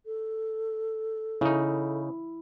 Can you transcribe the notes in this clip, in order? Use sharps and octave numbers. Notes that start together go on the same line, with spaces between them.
A4
C#3 D#4 E4